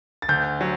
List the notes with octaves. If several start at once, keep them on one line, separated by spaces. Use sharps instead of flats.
A6
D2 G6
F#3